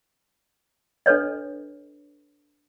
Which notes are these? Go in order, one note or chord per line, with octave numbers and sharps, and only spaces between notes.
D4 A4 B4 C#5 D#5